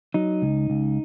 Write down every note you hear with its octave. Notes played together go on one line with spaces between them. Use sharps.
F#3 D#4
C#2
C#2